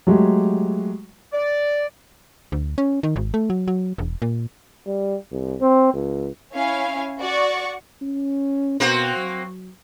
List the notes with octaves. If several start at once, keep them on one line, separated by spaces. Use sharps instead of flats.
F#3 G#3 A3 G4
D5
D2
C#4
D#3
G#1
A3
F#3
F#3
E1
A#2
G3
C2
C4
C#2
C#4 E4 F5 G#5
F#4 D5 F#5 C#6
C#4
B2 A#3 C4 F#4
F#3